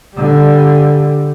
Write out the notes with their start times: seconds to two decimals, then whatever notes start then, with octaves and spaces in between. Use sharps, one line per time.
0.16 D3 G3